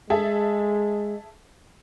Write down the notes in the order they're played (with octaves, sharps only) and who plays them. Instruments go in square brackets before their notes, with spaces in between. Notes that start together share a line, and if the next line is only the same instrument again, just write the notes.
[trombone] G#3 [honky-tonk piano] G#4 A4 E5